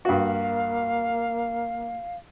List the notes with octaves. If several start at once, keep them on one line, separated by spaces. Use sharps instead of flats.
G2 A#3 F#4 F5